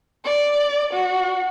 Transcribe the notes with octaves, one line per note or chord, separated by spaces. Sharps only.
D5
F#4